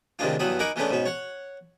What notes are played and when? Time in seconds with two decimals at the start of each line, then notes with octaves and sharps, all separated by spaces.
0.19 A2 C3 D#3 G#3 D4 F4
0.39 G2 E3 F#3 B3 B5 D#6
0.59 D#4 A#4 F#5 G#5 B5 D6
0.76 E3 G#3 A3 B3 C#4 D4
0.90 G#2 B2 C#4
1.06 C#5 F#5